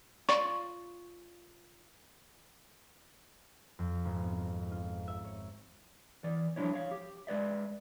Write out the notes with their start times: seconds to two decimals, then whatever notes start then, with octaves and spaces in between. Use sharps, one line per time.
0.29 F4 D5 B5 C#6
3.79 F2
4.05 G#1
4.21 B3
4.72 F4
5.08 E5
5.24 C#5
6.24 E3 D5
6.56 F3 G3 D4 E4 C#5
6.74 C#5 F5
6.91 G4
7.27 G#3 B4 D5 E5